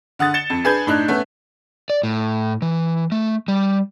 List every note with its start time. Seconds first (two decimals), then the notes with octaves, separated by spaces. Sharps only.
0.19 D3 F#5 D#6 A6
0.34 A6 C#7 E7 G7
0.50 F2
0.64 D4 G#4 B4 G6 G#6
0.87 A2 D4 D#4 F#6
1.08 A3 B3 C#4
1.90 D5
2.03 A2
2.62 E3
3.12 A3
3.48 G3